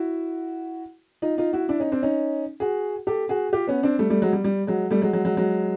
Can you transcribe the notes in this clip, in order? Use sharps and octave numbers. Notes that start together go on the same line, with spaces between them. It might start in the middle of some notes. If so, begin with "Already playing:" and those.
Already playing: E4 F#4
D#4 F4
D#4 F4
E4 F#4
D4 E4
C#4 D#4
C4 D4
C#4 D#4
F#4 G#4
G4 A4
F#4 G#4
F4 G4
B3 C#4
C4 D4
G3 A3
G3 A3
F#3 G#3
G3
G3
F#3 G#3
G3 A3
F#3 G#3
F#3 G#3
F#3 G#3
F#3 G#3